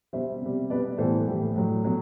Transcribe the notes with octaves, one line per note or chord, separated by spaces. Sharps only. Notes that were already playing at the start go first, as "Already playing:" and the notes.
B2 G3 C5 E5
C3 G3
B2 G3 B4 D5
A2 E3 G3 A4 C5
A2 E3 G3
A2 F#3
B2 F#3